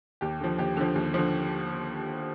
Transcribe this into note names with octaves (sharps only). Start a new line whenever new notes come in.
D#2 G4
D3 F3
D#2 G4
D3 F3
D#2
D3 F3